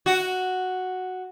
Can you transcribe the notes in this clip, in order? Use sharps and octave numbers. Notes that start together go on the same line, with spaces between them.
F#4